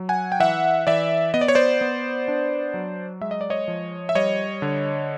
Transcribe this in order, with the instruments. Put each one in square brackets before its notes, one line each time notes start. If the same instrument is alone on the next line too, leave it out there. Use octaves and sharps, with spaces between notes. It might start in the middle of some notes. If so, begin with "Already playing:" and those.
Already playing: [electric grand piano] F#3
F#5 G#5
G5
E3 E5 F#5
E3 D5 E5
B3 D#5
D5
C#5
C5 D5
B3
D4
F#3
G#3 E5
D#5
D5
C#5 D#5
F3
E5
G3 C#5 D#5
D3